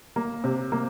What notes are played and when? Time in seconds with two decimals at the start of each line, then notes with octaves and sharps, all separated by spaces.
0.16 A#3
0.44 C3
0.72 A#3